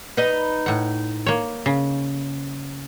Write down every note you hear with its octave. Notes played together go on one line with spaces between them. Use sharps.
D#4 B4 D#5
A2 F#5
A#3 C#5
C#3